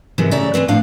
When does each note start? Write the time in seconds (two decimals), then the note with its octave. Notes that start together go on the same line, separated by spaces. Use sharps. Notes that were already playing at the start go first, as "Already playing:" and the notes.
0.18 D#2 G#2 C3 D#3 E3
0.31 A2 C#3 D5 E5 A#5
0.54 E3 F3 C4 B4
0.68 A2 F3 D4 F5